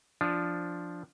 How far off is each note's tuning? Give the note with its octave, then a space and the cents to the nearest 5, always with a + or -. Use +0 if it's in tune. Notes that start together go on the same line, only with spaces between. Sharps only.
F3 +0 D4 +0